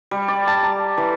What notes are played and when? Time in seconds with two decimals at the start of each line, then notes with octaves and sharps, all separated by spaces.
0.11 G3
0.28 D5
0.47 A5
0.63 A#5
0.97 E3